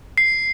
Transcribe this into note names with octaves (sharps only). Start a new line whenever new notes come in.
C7